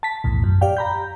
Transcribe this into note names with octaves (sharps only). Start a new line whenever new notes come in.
A5 B6
B1 E2 A2
F#2
G4 D5 F5 G5
A#5 B5 G6